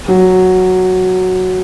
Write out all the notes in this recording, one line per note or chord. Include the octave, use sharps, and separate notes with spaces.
F#3